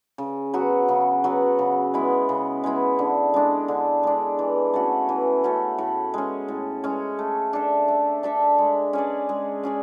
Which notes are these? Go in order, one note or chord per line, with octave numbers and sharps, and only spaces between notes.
C#3
F#3 B3 F#4
C#3
F#3 B3 F#4
C#3
G#3 B3 E4
C#3
G#3 B3 E4
D3
G#3 D4
D3
G#3 D4
E3
A3 C#4 F#4
E3
A3 C#4 F#4
A2
G#3 C#4
A2
G#3 C#4
A3
D4 A4 E5
A3
D4 A4 E5
G#3
C#4 G#4 D5
G#3
C#4 G#4 D5